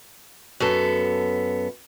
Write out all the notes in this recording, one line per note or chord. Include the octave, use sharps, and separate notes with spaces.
F#2 B3 A4